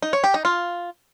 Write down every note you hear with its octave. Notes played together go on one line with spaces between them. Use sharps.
D#4
C#5
G4
D#4
F4